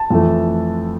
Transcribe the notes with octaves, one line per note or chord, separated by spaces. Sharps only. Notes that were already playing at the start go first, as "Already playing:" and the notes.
Already playing: A5
F2 E3 A3